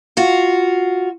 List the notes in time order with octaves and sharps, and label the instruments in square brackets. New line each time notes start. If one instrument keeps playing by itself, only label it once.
[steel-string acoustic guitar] F4 F#4